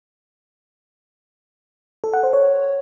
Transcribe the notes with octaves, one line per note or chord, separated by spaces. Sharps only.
A4
F#5
C5
C#5